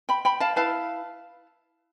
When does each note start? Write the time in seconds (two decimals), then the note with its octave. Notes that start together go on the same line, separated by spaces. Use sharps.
0.09 G5 B5
0.25 G5 B5
0.40 F5 A5
0.56 E4 B4 F5 A5